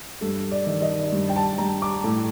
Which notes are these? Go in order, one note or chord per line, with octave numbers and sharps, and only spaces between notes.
G2 A4
D5
D#3
D#5
G2
G5
A5
G2 A#5
D6
A2